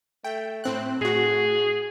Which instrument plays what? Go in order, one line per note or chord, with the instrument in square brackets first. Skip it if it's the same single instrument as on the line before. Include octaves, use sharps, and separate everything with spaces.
[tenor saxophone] A3 [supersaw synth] G5
[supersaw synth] A2 C4 F#6
[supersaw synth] A2 F#4 [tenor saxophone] G#4